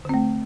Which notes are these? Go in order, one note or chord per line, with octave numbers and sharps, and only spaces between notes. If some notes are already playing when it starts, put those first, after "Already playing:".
D3 A3 C4